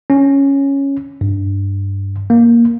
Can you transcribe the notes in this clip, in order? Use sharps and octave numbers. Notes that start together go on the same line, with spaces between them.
C#4
G2
A#3